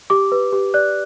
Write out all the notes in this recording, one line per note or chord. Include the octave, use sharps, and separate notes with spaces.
G4 D6
B4
G4
D5 F#6